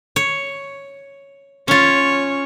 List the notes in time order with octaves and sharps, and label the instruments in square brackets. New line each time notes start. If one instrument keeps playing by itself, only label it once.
[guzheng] C#5
[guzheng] C#4 F4 [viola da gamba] C#5